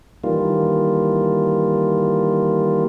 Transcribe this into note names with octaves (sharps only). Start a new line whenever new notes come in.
D#3 E3 G3 A#3 F4